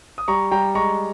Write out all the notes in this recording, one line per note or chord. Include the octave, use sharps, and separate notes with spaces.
D#6
G3 A#5 C#6
G3 G5 A#5
G#3 A#5 C#6